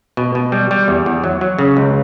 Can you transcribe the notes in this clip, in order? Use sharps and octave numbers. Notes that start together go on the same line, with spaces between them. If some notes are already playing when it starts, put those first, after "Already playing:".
B2
B2
G3
G3
E2
E2
F#3
F#3
C#3
C#2